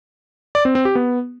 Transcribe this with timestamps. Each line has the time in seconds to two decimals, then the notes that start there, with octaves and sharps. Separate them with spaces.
0.55 D5
0.65 C4
0.75 C4
0.85 G4
0.95 B3